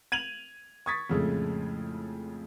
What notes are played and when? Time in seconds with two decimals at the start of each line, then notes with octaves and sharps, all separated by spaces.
0.12 G#6 D#7 F7 F#7
0.86 C#6 D#6 G#6 A6 B6
1.10 F2 A2 C#3 G#3 A3